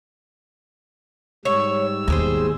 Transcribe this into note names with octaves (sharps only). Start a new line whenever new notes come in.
G#2 G3 C#5 E6
D#2 B2 G#4 A#4 C5